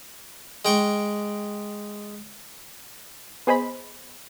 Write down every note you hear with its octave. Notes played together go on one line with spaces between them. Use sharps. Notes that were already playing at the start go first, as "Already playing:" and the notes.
G#3 G5 C#6
B3 G#4 C5 D#5 B5